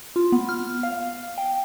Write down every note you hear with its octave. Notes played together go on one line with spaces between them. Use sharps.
F4
B3
F6
F5
G5